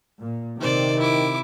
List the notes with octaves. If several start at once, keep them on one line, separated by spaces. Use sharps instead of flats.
A#2
C3 D#3 C5 D5
E4 D6